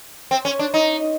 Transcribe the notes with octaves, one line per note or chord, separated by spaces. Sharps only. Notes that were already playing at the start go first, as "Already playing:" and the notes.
C4
C#4
D4
D#4